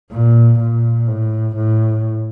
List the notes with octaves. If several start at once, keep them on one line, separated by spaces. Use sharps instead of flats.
A#2
A#2
A2
A2